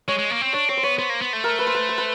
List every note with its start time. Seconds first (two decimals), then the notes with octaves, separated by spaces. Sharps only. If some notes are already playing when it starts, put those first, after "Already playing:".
0.08 G#3 C#5
0.19 G#3
0.30 A#3
0.41 C4
0.53 D4 C#5
0.69 C4 C#5
0.77 C5
0.83 B3 C#5
0.98 B3 C5
1.10 A#3
1.21 B3
1.33 A3
1.44 A#4
1.59 B4
1.67 C5
1.75 B4
1.89 C5
1.98 B4